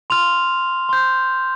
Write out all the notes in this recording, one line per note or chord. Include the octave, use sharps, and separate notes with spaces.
C6 F6 F7
C6 G6